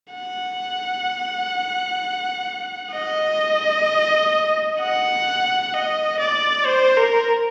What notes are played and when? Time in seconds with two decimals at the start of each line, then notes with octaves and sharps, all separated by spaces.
0.13 F#5
2.93 D#5
4.80 F#5
5.74 D#5
6.20 D5
6.66 C5
6.97 A#4